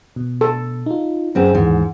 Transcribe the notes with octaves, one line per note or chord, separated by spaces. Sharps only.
B2
A4
D#4 F4
F#2 C4 G#4
D#2 G#2 E3